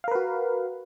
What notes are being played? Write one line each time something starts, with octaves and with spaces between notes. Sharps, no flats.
F#4 A#4 B4 F5